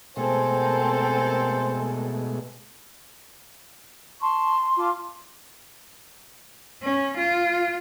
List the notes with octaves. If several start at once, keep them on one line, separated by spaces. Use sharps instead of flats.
B2 G#3 A3 C4 A4 A#4 C5 G#5
A5 C6 C#6
F4 A5 D6
C#4
F4